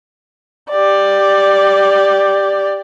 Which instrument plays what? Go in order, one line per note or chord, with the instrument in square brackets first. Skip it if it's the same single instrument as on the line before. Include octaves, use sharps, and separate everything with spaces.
[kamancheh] G4 D5